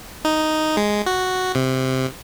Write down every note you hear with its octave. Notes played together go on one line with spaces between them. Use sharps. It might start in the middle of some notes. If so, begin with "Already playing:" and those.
D#4
G#3
F#4
C3